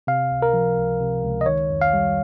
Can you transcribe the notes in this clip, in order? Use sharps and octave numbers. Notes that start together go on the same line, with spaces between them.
C3 F5
C#2
A#4
F3
C#2
C3
C#2
D#5
D#3 C#5
F2
F5
G3